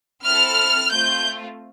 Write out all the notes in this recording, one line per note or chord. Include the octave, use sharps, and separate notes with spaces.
C4 E4 A4 F6
A3 C4 F4 G6